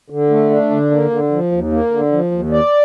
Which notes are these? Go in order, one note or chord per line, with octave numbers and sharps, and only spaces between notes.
D3
A3
D4
D3
A#3
D3
F3
D#2
A#3
D3
F3
D#2
D5